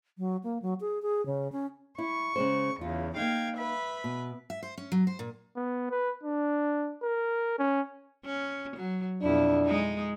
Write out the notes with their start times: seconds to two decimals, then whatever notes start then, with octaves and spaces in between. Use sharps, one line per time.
0.18 F#3
0.43 A#3
0.62 F#3
0.81 G#4
1.02 G#4
1.26 C#3
1.52 C#4
1.98 E4 C#6
2.36 C#3 G#3 C5
2.81 E2 C#3 F4
3.16 A#3 D#4 F5 G5 G#6
3.56 B4 E5 B5
4.04 B2
4.50 E5
4.63 C5
4.78 C#4
4.92 F#3
5.07 C5
5.19 A#2
5.56 B3
5.91 B4
6.24 D4
7.03 A#4
7.59 C#4
8.25 C#4
8.76 F#3
9.22 F2 B2 D4 E4
9.65 G#3 D#4